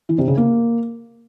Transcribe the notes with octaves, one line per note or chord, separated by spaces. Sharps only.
E3
C3
C#3
A#3